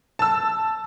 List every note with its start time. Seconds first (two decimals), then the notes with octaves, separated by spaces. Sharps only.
0.19 A5 E6